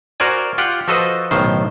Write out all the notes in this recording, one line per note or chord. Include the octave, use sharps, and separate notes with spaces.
F#4 A#4 C5 D5 G#5
F4 G4 F#5 G5
F3 F#4 A4 B4 C5 D#5
B1 A2 D#3 C5